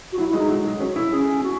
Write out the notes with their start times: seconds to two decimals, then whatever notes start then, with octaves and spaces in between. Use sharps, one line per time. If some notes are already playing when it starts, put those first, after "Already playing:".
0.12 F#4
0.18 F#3 E4
0.29 E4
0.33 G#3
0.39 D#4
0.49 F#3
0.65 F#3
0.80 C#4
0.96 E4
1.12 C#4 G#4
1.44 F#4